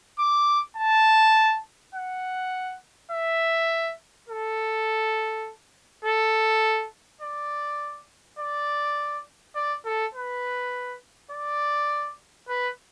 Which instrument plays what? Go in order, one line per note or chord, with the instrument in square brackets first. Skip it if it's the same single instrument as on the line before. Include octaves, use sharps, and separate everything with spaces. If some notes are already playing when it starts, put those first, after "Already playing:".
[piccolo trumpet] D6
A5
F#5
E5
A4
A4
D5
D5
D5
A4
B4
D5
B4